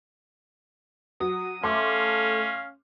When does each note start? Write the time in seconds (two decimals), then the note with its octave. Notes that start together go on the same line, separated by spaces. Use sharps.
1.20 F#3 D#6
1.64 A3 C#4 F5 C6 D6